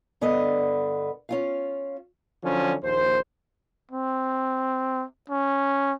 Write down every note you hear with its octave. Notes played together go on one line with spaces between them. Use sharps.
G2 D3 B3 D#5
C#4 F4 F5
D3 F3 F#3 C#4
A#1 D#2 C5
C4
C#4